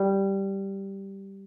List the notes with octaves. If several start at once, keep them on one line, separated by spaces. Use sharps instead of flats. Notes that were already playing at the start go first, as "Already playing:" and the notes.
Already playing: G3